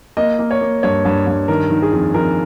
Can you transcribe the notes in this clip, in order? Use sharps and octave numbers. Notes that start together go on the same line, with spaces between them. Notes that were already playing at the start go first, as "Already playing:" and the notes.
A#3 D#5
A#3
C#5
A#3
G2 C#5
G2
G2
D#3 A#4
D#3
G#4
F2
F2 A#4